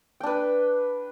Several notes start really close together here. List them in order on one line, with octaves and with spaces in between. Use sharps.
G5 D4 B4